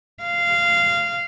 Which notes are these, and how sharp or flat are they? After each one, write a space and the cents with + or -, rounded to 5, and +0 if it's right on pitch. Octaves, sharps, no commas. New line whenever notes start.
F5 -15